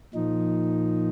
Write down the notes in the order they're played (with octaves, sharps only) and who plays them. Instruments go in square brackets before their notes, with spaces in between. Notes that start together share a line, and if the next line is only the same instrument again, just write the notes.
[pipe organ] A#2 F3 D#4